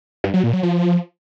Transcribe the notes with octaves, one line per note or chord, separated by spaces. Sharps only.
G2
F#3
A#2
F#3
F3